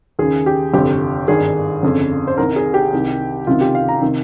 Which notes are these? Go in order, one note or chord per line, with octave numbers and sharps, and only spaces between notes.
D#2 C#3 G#4
G4
G1 F2 C3 G4
G#1 G2 D#3 G#4
G1 F2 C#3
C5
C2 C3 D#3 A#4
G#4
G4
C2 C3 D#3
C#2 C3 D#3 F4
G4
F5
A#5
C3 D#3